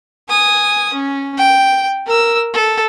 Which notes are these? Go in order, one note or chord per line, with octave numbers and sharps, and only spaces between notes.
G#5 D#6
C#4
G5
A#4 E6
A4